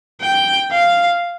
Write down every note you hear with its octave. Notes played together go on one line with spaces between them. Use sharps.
G5
F5